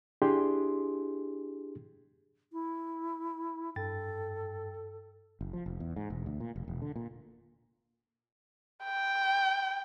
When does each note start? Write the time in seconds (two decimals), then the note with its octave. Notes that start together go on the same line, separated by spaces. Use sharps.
0.22 D4 E4 G4 G#4 C6
2.53 E4
3.76 G2 A4 G5 A6
5.41 F#1
5.53 F3
5.66 F1
5.80 E2
5.96 G#2
6.10 E1
6.26 D2
6.40 A#2
6.56 F1
6.68 E1
6.82 D3
6.96 A#2
8.85 G5